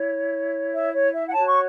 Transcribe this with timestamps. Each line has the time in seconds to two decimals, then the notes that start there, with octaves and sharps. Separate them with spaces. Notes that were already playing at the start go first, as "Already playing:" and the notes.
Already playing: E4 C#5
0.73 E5
0.93 C#5
1.12 E5
1.27 F#5
1.32 F#4 C#5 A5
1.47 C#6